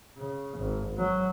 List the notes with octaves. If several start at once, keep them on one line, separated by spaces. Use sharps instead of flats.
C#3
G#1
F#3